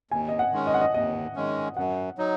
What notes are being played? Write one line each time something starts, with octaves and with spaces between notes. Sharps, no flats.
D#2 G#5
D#5
F#5
D#3 G#3 C#4
D#5
F#5
D#5
D#2 D#5
D#3 G#3 C#4
F#2 F#5
F#3 D#4